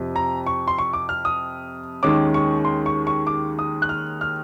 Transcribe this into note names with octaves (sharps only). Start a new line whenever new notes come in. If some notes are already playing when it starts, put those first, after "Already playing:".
Already playing: F2 C3 F3
A#5
C#6
C6
C#6
D6
F6
D#6
D#2 D#3 G#3 C#4 D6
C#6
C6
C#6
C#6
D6
D#6
F#6
F6
F6